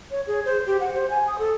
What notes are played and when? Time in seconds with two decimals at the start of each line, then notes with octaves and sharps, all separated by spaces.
0.11 C#5
0.27 G#4
0.45 C5
0.67 G4
0.80 F#5
0.94 C5
1.10 G#5
1.27 D#6
1.39 A4